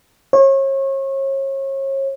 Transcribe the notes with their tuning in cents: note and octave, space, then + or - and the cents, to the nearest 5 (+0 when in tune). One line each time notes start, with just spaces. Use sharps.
C#5 -35